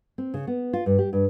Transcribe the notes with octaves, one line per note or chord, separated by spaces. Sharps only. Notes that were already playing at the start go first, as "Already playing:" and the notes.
C4
C#3
B3
F4
G2
G4
G2